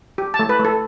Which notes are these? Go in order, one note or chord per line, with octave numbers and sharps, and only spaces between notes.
G4
A5
A3
B4
A3
A4